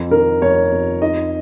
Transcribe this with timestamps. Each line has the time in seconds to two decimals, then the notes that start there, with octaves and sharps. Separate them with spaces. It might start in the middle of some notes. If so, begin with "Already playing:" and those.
Already playing: F2
0.11 D#3 A#4
0.42 F2 C#5
0.72 F2
1.02 D#4 D#5